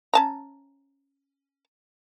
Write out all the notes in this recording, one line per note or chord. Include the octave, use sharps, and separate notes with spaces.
C#4 A5 A#5